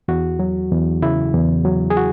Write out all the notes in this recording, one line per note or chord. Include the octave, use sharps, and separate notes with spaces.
E2 F#4
F#3
E2
C#3 E4
E2
F#3
G#4
F#4